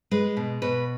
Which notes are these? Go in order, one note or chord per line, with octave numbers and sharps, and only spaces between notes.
G#3 B4
B2
B2 B4